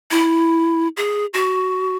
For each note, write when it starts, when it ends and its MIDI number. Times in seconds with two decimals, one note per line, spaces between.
0.11 0.88 64
0.97 1.26 68
1.34 1.97 66